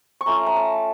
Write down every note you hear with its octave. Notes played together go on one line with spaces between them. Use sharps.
C#6
A3 C#4 F4 A#5
A#5
A5